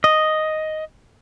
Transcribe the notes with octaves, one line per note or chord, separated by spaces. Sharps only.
D#5